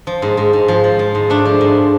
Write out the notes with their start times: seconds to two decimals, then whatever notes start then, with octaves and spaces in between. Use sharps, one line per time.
0.07 F3
0.22 G#2
0.37 G#2
0.53 G#2
0.68 F3
0.84 F3
0.99 F3
1.15 G#2
1.30 A3 D4
1.45 F3
1.61 G#2